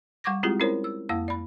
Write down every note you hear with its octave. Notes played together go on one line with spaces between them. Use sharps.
G3 F#5 C#6 D6 G#6 A#6
G#3 C4 E4 F4 G4 G#4
C4 C#4 E4 A#4 C5 C#5
E6
F2 A#3 E4 F5 E6
D5 B5